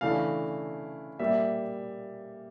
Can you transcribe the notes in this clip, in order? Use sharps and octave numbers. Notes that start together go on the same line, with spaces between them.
C#3 E3 A3 D4 F5
A#2 G3 A#3 E5